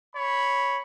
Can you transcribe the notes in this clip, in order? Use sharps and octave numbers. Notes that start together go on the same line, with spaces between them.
C#5 B5